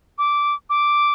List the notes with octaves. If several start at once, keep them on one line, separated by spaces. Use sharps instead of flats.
D6
D6